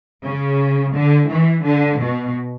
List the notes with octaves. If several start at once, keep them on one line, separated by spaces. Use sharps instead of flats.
C#3
D3
E3
D3
B2